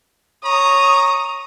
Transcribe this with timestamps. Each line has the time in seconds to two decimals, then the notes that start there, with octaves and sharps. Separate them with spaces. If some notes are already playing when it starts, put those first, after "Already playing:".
0.45 C#5 A#5 D#6